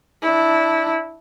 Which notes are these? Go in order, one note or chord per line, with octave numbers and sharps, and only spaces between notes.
D4 E4